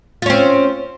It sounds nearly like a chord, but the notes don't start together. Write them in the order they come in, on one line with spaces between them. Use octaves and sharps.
F4 C#4 C4